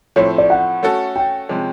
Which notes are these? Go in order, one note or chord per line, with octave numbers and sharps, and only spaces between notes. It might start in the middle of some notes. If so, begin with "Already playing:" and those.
A2 F3 A3 C4 C#5
D5
F#5
A3 C#4 F#4 A4
G5
C3 F3 G#3 C#4